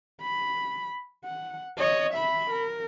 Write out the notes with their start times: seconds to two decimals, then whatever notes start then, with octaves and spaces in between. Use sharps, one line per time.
0.21 B5
1.25 F#5
1.78 C#5 D#5
2.14 E5 B5
2.51 A#4